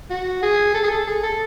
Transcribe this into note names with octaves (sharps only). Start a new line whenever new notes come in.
F#4
G#4
A4
G#4
A4
G#4
A4